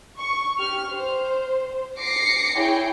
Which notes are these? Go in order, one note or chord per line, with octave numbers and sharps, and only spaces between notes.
C#6
G4 F6
C5
D6 A#6 C7 C#7
E4 G#4 C#5 G5